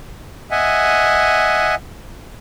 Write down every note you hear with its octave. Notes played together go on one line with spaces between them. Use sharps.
D#5 E5 F#5 G#5